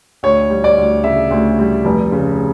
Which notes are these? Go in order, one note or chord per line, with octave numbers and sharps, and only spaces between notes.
D2 C#5
G3
D5
D2
C#3 E5
D2
G3
F1
C#3